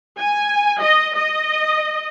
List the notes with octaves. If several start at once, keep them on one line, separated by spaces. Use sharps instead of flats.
G#5
D#5
D#5